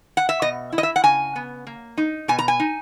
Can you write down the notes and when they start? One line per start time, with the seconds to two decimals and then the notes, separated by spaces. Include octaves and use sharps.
0.17 F#5
0.29 E5
0.42 B2 D#5
0.72 E4
0.78 D#5
0.83 E5
0.96 F#5
1.04 C#3 G#5
1.36 B3
1.67 A#3
1.98 D#4
2.28 B2 G#5
2.39 A#5
2.48 G#5
2.60 D#4